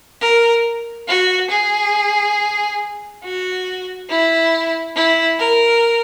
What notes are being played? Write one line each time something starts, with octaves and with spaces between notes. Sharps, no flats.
A#4
F#4
G#4
F#4
E4
E4
A#4